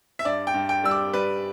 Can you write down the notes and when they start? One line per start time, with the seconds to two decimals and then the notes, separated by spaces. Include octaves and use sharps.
0.19 E5
0.25 G2 D5
0.47 G5
0.54 G2
0.69 G5
0.84 G3 E6
0.91 D6
1.13 G3 B4